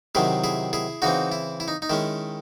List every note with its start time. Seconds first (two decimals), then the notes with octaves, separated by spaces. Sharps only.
0.15 C3 D#3 F#3 E4 G#4
0.44 E4 G#4
0.73 E4 G#4
1.02 C#3 E3 C4 D#4 F#4
1.32 E4
1.60 E4
1.68 D#4
1.82 D#4
1.90 D#3 G#3 C#4 E4